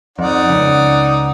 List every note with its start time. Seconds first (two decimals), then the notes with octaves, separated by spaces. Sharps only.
0.19 F2 D#4 D5 F#5
0.49 C#2 C#3